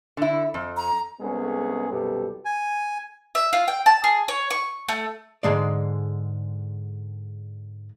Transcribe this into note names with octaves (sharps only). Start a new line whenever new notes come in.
D3 E4
F2
A#5
C2 G#3 B3 C#4 G#4 A4
C2 F#2 B2 G4 A4 B4
G#5
E5
F4
G5
A5
G#4
C#5
C#6
A3
G#2 D3 G#3 D5